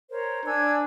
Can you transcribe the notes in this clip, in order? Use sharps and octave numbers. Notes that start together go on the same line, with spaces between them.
A#4 C5 C#5
D4 G#5 E6 G#6